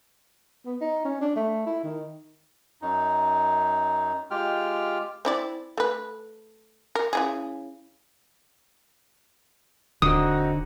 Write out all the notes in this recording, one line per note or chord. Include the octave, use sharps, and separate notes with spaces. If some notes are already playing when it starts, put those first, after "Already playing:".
B3
D#4
C#4
D4
A3
E4
D#3
F#2 D#4
G#3 F4 G4 G5 F6
C4 E4 D5
A3 B4
A#4
C#3 E4 G#4
D#1 D3 C4 D#4 F#4 D#6